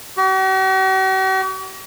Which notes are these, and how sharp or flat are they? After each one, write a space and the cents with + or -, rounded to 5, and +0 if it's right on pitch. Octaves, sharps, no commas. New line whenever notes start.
F#4 +45